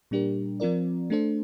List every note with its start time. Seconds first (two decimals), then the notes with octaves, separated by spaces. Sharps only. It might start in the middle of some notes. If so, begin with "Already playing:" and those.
0.11 A#2 G3 D4 G4 A#4
0.60 F3 C4 F4 A#4 D5
1.10 A3 D4 A4 C5